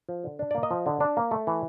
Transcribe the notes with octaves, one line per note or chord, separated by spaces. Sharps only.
F3
D3
D4
A#3 D5
D#5
F3
D3
D4
A#3
A3
E3